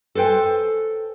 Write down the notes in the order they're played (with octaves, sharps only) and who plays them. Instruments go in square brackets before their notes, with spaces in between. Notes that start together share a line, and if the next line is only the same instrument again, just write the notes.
[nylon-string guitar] A4 B4 C5 G5 G#5